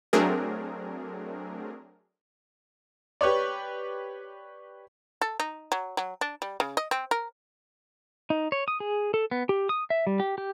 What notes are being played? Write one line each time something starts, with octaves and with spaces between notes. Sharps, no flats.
F#3 A3 C4 D4 G#4 A#4
G4 B4 C#5 D5
A4
D#4
F#3
F#3
D4
G3
C#3
D#5
C4
A#4
D#4
C#5
D#6
G#4
A4
B3
G4
D#6
E5
G3
G4
G4